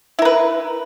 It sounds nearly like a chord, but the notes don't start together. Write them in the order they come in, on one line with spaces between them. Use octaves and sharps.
E4 A#4 B4